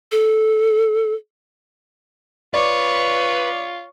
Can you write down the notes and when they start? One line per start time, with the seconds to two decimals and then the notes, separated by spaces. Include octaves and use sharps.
0.12 A4
2.54 F4 B4 C#5 D5